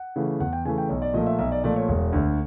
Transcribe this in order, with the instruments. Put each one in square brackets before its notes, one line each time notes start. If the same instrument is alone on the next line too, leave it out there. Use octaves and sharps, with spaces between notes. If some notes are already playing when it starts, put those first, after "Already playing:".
Already playing: [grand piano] F#5
C#3 E3 A3
E2 F#5
G5
C#3 E3 A3 G#5
G5
B1 C#5
D5
A#2 F3 A3 D#5
E5
B1 E5
D5
A#2 F3 A3 D5
C#5
E1
D2 D3